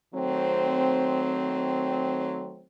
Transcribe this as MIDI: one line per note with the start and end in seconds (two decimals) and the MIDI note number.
0.14 2.66 51
0.14 2.66 54
0.14 2.66 57
0.14 2.66 60